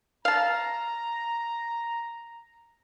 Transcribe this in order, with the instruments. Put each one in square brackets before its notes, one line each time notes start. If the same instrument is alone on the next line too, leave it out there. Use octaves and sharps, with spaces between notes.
[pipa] F5 A5 [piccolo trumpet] A#5